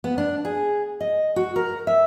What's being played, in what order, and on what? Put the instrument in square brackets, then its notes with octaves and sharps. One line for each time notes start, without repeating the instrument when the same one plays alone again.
[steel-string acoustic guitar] B3
D4
G#4
D#5
F#4
A#4
E5